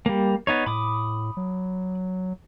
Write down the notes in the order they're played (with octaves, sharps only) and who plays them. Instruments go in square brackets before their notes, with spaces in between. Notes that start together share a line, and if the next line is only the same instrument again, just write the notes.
[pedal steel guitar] G3 A#3
B3 D#4 C#5
[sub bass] A2 [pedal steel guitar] B5 D6 D#6
[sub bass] F#3